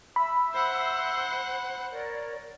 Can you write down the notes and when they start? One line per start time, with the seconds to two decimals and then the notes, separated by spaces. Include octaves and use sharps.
0.16 E5 B5 E6
0.54 C5 F#5
1.91 A#4 C#5 D5